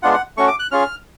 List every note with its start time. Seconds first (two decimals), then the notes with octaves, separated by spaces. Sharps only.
0.03 G#3 B3 D4 F4 F#5
0.14 F#5
0.37 A3 C#4 F#4 C#6
0.48 D6
0.59 F#6
0.71 C#4 F4 G#4 F6